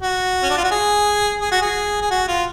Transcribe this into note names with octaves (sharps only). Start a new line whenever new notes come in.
F#4
C#4
D4
F4
F#4
G#4
G#4
F#4
G#4
G#4
F#4
F4